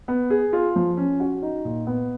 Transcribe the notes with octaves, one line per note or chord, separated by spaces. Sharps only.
B3
G#4
F4
F3
C#4
F#4
D#4
A#2
B3